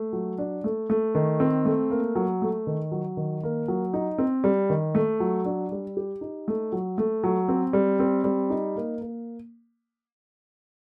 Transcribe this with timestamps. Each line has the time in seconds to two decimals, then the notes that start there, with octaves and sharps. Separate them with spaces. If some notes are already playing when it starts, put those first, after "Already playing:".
Already playing: A3
0.13 F#3
0.38 D4
0.64 A3
0.90 A3
1.15 D#3
1.40 C4
1.65 A3
1.90 A#3
2.15 F#3
2.42 A3
2.67 D#3
2.92 F#3
3.17 D#3
3.43 A#3
3.68 F#3
3.93 D#4
4.18 C4
4.44 G3
4.70 D#3
4.95 A3
5.20 F#3
5.45 D4
5.72 G3
5.97 G4
6.21 D#4
6.48 A3
6.72 F#3
6.98 A3
7.24 F#3
7.48 C4
7.73 G3
8.00 C4
8.24 G3
8.50 D#4
8.76 A#3
9.01 A#3